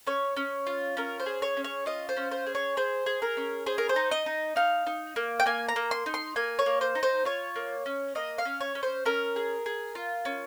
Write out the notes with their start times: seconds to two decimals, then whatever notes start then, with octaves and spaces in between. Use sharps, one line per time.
0.07 C#4 C#5
0.37 C#4
0.67 F4
0.97 C#4 A#4
1.20 C5
1.26 G#4
1.42 C#5
1.57 C#4
1.64 C#5
1.86 F4 D#5
2.09 C5
2.17 C#4
2.31 C5
2.46 G#4
2.55 C#5
2.77 G#4 C5
3.06 G#4
3.22 A#4
3.37 C#4
3.66 G#4 C5
3.78 A#4
3.89 C5
3.96 D#4
4.11 D#5
4.26 D#4
4.56 D#4 F5
4.87 D#4
5.16 A#3
5.40 G5
5.46 A#3 G#5
5.69 A#5
5.76 A#3
5.91 C6
6.06 D#4
6.14 C6
6.36 A#3 G#5
6.59 C#5
6.66 A#3
6.81 C5
6.95 D#4
7.03 C5
7.25 F4 C#5
7.56 A#3
7.86 C#4
8.15 A#3 D#5
8.38 F5
8.45 C#4
8.61 C#5
8.75 C#4
8.83 C5
9.05 C#4 A#4
9.36 G#4
9.66 G#4
9.95 F4
10.25 C#4